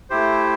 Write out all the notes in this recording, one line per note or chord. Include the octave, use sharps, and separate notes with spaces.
A3 E4 G4 C5